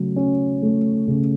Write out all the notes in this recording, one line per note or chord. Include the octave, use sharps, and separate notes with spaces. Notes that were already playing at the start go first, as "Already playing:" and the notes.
Already playing: C#3 F#3 A3
C#4
A3
C#3